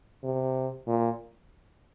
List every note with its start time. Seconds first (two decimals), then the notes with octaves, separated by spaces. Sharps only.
0.24 C3
0.87 A#2